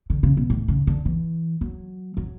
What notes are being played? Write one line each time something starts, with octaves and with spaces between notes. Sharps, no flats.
D3
C#3
B2
A2
C#3
D3
E3
F#3
F#3